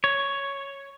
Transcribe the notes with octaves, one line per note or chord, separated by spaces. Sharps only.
C#5